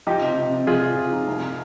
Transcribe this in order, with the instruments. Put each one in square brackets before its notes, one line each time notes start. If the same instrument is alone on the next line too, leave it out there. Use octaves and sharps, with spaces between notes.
[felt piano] F3 [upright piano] D#4 G4
[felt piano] C3
C3
C3
[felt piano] F3 [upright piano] F4 G#4
[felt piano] F3
C3
D#4
C2